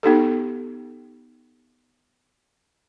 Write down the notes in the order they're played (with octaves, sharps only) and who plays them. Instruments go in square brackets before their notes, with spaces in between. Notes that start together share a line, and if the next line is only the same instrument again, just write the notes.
[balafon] B3 D#4 G4 A4